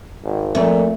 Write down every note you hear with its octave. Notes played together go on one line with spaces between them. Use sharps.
G#1
F2 A#2 A3